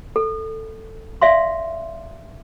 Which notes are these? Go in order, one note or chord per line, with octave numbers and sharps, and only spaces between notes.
A4
D5 E5 F5 C6